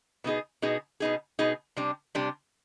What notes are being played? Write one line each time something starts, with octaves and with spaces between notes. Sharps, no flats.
B2 B3 D#4 G#4
B2 B3 D#4 G#4
B2 B3 D#4 G#4
B2 B3 D#4 G#4
C3 G3 D4
C3 G3 D4